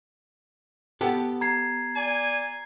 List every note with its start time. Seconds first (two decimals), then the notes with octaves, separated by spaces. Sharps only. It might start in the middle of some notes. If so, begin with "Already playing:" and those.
1.01 B3 G4 A4
1.41 A#5 G#6 C7
1.95 D5 G#5